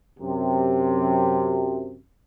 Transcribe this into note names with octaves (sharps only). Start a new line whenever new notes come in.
F#2 C3